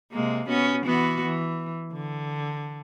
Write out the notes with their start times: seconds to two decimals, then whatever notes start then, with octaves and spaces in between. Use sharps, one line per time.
0.12 C3 G#3 A#3
0.48 B3 C#4 F#4
0.85 E3 B3 F#4
1.25 E3
1.93 D3